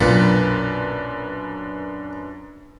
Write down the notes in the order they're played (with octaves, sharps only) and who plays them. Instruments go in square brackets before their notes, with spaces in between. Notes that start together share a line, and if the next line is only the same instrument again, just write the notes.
[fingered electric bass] B1 [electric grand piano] F#2 D4 B4 [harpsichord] A#2